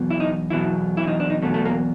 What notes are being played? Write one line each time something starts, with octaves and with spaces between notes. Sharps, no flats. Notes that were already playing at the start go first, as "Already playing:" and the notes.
Already playing: E2 B2 F#3
E4
D#4
E2 B2 F#3 E4
E4
D#4
D4
D#4
E2 B2 F#3 A3
A3
A#3